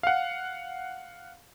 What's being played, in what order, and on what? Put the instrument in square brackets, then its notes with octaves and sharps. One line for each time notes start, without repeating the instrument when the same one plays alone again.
[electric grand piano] F5 F#5